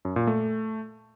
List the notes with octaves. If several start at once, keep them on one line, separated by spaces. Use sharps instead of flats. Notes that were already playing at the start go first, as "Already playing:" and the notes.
F#2
A#2
A3